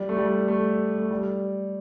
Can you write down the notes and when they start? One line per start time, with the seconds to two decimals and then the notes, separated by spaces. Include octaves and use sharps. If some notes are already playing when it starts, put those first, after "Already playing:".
Already playing: G3
0.09 A3
0.17 G3
0.48 A3
0.99 A3
1.11 G3